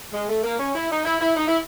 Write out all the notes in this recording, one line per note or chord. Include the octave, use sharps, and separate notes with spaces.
G#3
A3
A#3
C#4
E4
D#4
E4
E4
D#4
E4